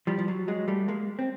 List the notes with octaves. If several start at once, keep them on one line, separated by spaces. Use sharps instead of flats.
F3 G3
F3
F#3
F#3 G#3
G3 A3
G#3 A#3
C4